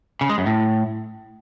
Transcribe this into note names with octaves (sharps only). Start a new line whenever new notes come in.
C#3
G#3
F#2
A2